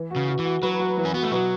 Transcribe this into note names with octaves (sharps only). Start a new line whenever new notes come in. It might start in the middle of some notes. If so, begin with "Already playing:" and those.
Already playing: E3
F#4
C#3
F#4
E3
F#4
F#3 B4
F#4
E3
C#4
B3 F#4
A3
B2 F#3